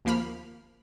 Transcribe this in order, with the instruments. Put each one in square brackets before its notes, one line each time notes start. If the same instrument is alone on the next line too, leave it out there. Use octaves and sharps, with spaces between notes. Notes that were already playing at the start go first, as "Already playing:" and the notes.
[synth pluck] D#2 F3 A#3 B5 F6